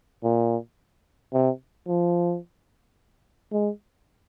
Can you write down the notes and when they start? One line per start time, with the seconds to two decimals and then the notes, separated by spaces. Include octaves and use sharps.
0.23 A#2
1.33 C3
1.88 F3
3.52 G#3